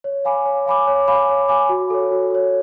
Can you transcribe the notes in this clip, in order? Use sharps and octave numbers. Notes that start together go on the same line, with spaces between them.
C#5
F5 G#5 B5 D6
C#5
F5 G#5 B5 D6
C#5
F5 G#5 B5 D6
C#5
F5 G#5 B5 D6
F#4
A4 C#5
F#4
A4 C#5